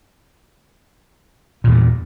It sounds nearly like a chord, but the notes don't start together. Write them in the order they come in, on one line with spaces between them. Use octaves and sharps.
A#2 E2 G2